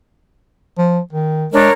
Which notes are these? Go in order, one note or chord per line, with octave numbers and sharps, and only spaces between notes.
F3
D#3
G#3 D4 A#4 C#5